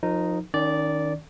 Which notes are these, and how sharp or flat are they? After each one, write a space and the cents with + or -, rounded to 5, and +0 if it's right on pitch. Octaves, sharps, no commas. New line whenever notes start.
F3 +30 D#4 -5 A#4 +0
D#3 +0 C#4 +35 D5 -10